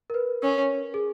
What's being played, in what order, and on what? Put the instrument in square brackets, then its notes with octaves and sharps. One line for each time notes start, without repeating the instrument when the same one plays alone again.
[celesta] A#4
B4
[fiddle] C#4 [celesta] A#4
[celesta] G#4